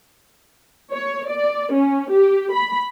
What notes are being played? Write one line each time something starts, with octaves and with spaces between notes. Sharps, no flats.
C#5
D5
C#4
G4
B5